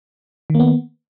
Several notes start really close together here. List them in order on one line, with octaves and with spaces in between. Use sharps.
D#3 A#3 B3